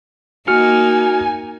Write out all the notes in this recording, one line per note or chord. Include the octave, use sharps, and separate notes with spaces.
A#3 D#4 F#4 G#5 F6 C#7